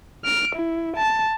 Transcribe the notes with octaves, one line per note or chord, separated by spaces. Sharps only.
F6 D7
E4
A5